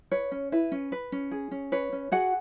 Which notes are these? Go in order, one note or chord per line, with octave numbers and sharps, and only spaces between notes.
B4 C#5
C#4
E4 B4
C#4
B4
C#4
G#4
C#4
B4 C#5
C#4
F#4 G#4 F#5